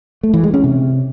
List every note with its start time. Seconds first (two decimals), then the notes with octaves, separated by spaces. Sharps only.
0.23 A3
0.34 E3
0.44 G#3
0.54 C#4
0.64 C3